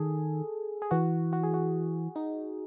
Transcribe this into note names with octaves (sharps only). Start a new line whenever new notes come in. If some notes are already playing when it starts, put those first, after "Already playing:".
Already playing: D#3 G#4 A4
G#4
E3 F#4
F#4
G#4
F#4
D#4